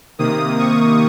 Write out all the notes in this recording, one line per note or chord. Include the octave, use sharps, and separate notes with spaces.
C3 D#3 A#3 D#6
C#6